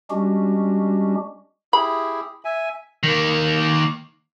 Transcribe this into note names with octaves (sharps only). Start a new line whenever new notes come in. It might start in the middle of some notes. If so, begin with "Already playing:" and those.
G3 G#3 C#4 D4 F#4 G4
E4 G4 G#4 B5
E5 G#5
D#3 A#3